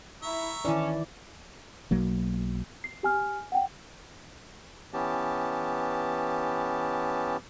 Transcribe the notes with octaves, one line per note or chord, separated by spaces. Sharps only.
E4 E5 A#5 C#6
D#3 E3 C#4 D5 A5
B1 F#3 A#3
C7
G4 G#5 F6
F#5 G5
E3 B3 C#4 G4 A5